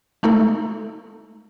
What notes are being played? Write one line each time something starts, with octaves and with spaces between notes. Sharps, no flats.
G#3 A3 D#4 A4